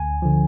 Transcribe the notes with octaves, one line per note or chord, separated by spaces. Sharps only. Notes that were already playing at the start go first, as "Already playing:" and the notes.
Already playing: D2 G#5
D3 F3